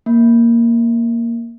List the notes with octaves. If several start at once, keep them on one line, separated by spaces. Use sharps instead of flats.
A#3